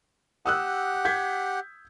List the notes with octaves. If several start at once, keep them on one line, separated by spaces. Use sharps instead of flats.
G4 F#5 D#6 E6 F#6
G6 G#6 B6